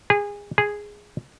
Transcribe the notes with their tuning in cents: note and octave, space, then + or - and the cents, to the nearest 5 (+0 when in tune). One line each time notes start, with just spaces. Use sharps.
G#4 -25
G#4 -5